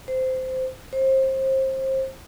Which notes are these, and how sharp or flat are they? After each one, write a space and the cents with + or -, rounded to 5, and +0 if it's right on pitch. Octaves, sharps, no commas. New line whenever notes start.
C5 -15
C5 +25